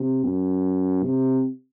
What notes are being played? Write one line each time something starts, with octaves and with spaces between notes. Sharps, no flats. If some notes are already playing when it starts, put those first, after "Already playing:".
Already playing: C3
F#2
C3